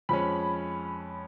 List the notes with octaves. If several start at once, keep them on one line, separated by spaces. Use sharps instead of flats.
F2 F3 G#3 C#4 B5